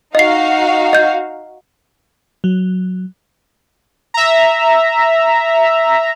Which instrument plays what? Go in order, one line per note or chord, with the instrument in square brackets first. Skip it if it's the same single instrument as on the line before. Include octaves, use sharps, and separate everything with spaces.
[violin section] D#4 F#4 F5 [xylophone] D#5 C7
[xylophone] D#5 G6
[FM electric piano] F#3
[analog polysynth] E5 A#5